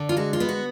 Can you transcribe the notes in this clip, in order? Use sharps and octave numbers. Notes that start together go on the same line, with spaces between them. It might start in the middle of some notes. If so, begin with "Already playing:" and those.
Already playing: D3
F4
G#3 F#4
F4
B3
F#4